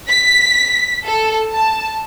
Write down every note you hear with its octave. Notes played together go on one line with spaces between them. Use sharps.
B6
A4
A5